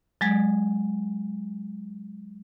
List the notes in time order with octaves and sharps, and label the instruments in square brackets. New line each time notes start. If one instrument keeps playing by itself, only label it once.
[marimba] F#3 G#3 G#6